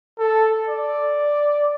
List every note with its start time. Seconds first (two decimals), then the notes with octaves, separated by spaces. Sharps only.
0.19 A4
0.69 D5